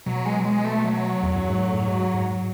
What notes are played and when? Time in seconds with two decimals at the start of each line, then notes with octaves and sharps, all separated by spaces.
0.06 B2 F#3
0.26 G#3
0.39 F#3
0.45 G#3
0.65 A3
0.84 F#3
1.23 E2
1.36 F#2
1.48 G#2
1.62 A2
1.87 G#2
2.14 G#2